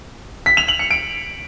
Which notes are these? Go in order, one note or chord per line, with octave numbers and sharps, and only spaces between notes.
B6
F7
F#7
C#7
D7